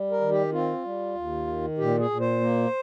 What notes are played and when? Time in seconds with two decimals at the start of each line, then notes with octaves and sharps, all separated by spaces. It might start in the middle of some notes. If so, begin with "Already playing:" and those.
Already playing: G3
0.11 A#4
0.21 D#3
0.32 G4
0.52 C4 F4
0.84 G3
1.15 D#2
1.47 D#3
1.78 A#2 G4
1.99 G#4
2.10 A#2
2.20 C5
2.41 A#3